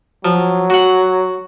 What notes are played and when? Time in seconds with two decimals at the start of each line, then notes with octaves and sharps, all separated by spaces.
0.25 F3 F#3
0.70 F#4 F#5